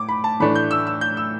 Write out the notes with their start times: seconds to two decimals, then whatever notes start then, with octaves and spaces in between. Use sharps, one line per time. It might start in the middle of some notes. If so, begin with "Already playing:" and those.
Already playing: A2 D6
0.09 B5
0.24 A5
0.40 A2 E3 A3 D4 B5
0.55 G6
0.71 E6
0.87 E6
1.01 G6
1.17 E6